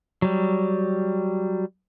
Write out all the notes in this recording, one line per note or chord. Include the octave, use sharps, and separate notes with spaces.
F#3 G3